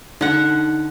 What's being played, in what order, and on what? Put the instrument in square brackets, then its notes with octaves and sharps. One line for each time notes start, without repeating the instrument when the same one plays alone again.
[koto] D3 F#5 [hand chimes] D#4